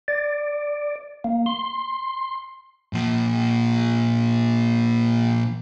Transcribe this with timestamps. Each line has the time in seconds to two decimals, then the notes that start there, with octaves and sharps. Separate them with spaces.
0.08 D5
1.24 A#3
1.46 C6
2.93 A#2 F3